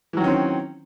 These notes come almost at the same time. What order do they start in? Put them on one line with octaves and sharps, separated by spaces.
E3 F#3 D#3 C#4 C4